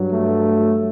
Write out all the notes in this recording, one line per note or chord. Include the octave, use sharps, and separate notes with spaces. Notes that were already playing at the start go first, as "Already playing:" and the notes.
Already playing: G2 F#3
A3